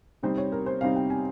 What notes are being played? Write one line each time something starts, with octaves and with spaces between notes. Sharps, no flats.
C3 G3 C4 D#4 C5
C#5
A#4
C5
C3 G3 C4 D#4 F5
G5
G#5